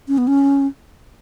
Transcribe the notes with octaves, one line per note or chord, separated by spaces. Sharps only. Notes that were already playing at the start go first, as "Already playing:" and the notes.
C#4
B3
C#4